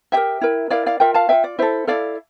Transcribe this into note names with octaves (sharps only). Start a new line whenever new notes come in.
E4 G4 A#4 E5 G5
E4 A#4
E4 A#4 D5 F5
D5 F5
F4 A#4 E5 G5
F5 A5
F4 A#4 E5 G5
D5
E4 A4 C5 E5
E4 A4 D5 F5